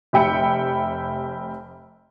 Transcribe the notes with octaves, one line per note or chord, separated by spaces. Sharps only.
F1 G4 E5 G5 B5 C#7